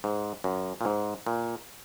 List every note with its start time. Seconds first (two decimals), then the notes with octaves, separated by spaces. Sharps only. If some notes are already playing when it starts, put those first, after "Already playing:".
0.04 G#2
0.44 F#2
0.81 A#2
0.85 G#2
1.27 A#2